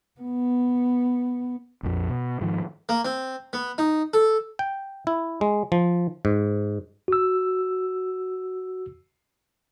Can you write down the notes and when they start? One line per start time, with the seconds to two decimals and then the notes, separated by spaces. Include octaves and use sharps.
0.20 B3
1.83 A#1 F2
2.09 B2
2.41 G#2 D#3 F3
2.89 A#3
3.05 C4
3.53 B3
3.78 D#4
4.14 A4
4.59 G5
5.07 E4
5.41 G#3
5.72 F3
6.25 G#2
7.08 F#4 E6